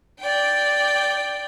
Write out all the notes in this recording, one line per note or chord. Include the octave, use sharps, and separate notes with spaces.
D5 G5